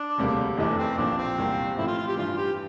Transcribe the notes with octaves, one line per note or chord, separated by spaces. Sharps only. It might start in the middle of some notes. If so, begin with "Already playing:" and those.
Already playing: D4
E1 D2 C3 G3 A#3
F1 E2 E3 A3 D4
C4
A#1 A#2 F3 D4
C4
E2 C3 G3 A#3
A2 F3 C4 E4
F4
F4
G4
G2 E3 G3 D4 F4
G4